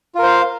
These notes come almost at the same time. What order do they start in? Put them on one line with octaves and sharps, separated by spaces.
F4 A#4 C5 F5